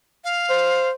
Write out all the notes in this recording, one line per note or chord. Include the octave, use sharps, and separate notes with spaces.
F5
C5